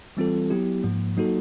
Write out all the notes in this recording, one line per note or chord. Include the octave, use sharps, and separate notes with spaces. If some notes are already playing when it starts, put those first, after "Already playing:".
E3 G3 C4 F4 A4
F#3 B3 E4 G4
G#2 F3 A#3
F#3 A#3 D#4 F#4 A4